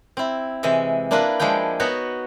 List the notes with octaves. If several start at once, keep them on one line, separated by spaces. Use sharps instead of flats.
C4 E4
C3 E3 G#3 E5
A#3 D4 E4 F4 A#4 B4
F3 G#3 D4 E4 G5
B3 D#4 F#4 B4 C#5